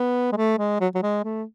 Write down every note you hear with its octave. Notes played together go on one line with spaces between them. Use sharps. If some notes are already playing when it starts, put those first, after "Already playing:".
Already playing: B3
G#3
A3
G#3
F#3
F#3
G#3
A3